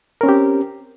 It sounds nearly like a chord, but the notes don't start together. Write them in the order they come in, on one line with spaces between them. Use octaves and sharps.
A#4 C#4 C4 G4